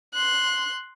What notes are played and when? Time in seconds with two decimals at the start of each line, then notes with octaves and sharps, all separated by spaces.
0.14 C6 F#6